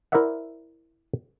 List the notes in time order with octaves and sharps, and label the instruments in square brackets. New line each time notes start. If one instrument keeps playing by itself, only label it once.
[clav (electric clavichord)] E4 A#4 C5 D5 E5 F#5